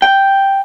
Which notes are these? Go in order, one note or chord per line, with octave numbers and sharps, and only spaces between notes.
G5